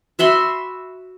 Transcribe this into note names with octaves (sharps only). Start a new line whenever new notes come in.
F#4 E5 B5 C6